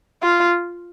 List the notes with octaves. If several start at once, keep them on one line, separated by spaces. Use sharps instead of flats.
F4